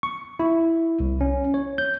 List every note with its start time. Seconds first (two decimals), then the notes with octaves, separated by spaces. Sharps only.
0.03 C#6
0.39 E4
1.00 C2
1.21 C#4
1.54 C#5
1.78 G6